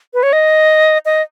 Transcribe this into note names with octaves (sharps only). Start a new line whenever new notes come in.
B4
C#5
D#5
D#5